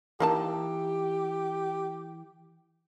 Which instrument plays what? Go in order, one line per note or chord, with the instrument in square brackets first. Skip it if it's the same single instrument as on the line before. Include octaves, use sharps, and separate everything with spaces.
[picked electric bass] E3 [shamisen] A#3 D#4 A5 [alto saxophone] G4